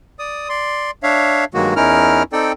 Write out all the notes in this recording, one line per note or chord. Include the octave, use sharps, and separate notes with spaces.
D5 D#6
D5 C6
D4 C#5 E5 F5
G2 D#3 F#3 G#3 A#3 F#4
E2 C#4 D#4 E4 A#4 F6
C4 D#4 A4 D5 G5